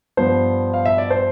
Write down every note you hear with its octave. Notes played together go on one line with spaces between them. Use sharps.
G2 F3 B3 C5
F5
E5
D5
C5